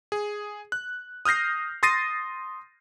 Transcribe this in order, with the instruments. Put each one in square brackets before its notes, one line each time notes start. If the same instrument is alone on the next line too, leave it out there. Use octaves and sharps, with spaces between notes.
[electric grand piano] G#4
F#6
D#6 F6 G6 A#6 C7
C6 D#6 A6 A#6 C7 D#7